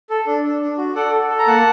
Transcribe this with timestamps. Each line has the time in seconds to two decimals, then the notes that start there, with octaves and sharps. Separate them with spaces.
0.10 A4
0.26 D4
0.43 D4
0.61 D4
0.77 F#4
0.95 A4 D5 F#5
1.12 A4
1.29 A4
1.39 A#5
1.47 A#3 F#5 A5